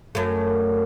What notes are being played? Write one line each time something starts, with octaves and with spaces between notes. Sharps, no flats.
F#2 A3